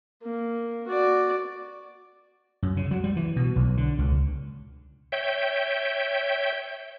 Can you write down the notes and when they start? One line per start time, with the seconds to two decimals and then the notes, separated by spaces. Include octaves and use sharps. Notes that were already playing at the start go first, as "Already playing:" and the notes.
0.23 A#3
0.87 F#4 D5
2.63 F#2
2.77 C#3
2.91 F#3
3.04 G3
3.17 E3
3.36 B2
3.56 B1
3.77 D3
3.98 C#2
5.12 C#5 E5 G5 G6